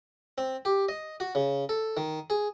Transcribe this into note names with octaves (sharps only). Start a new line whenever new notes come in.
C4
G4
D#5
F#4
C#3
A4
D#3
G#4